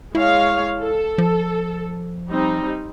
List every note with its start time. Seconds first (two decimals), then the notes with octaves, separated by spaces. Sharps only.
0.15 G#3 E4 C#5 F5
0.82 A4
1.18 F3
2.30 G3 C4 D#4